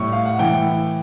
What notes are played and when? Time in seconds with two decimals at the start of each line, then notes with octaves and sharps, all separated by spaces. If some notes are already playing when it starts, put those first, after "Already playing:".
Already playing: A2 G3 C#6
0.12 F5
0.26 F#5
0.39 E3 G5